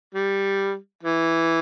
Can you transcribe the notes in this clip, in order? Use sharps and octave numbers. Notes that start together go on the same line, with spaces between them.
G3
E3